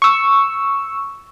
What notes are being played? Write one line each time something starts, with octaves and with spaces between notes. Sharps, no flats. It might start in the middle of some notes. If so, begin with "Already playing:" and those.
C#6 E6